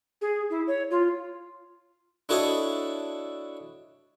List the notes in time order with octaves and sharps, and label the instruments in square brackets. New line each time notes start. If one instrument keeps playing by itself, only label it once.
[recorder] G#4
E4
C#5
F4
[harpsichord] D4 E4 F#4 A4 C#5 D#5